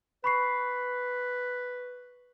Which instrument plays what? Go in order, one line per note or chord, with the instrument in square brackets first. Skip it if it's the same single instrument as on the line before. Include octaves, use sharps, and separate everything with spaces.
[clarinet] B4 [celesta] B5 C#6 C7